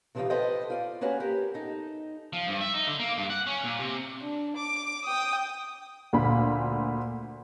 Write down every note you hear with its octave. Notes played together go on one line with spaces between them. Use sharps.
C3 E3 F3 D4 D#4 F4
A4 B4 C5 D5 D#5 G5
F4 D5
A#3 C#4 F#4 B4 D5 G#5
G4 A#4
D#4 A4
F3
G2
E5
D#4
D3
A#3
G2
F#5
C#4
A#2
C3
D4
D6
G5 D#6
D2 A#2 B5